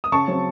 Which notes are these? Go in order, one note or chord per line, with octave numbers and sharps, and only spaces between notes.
D#6
C#3 A5 C#6
F#3 C4